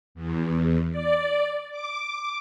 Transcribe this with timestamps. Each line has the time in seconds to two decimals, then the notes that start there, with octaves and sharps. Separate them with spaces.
0.15 E2
0.90 D5
1.71 D6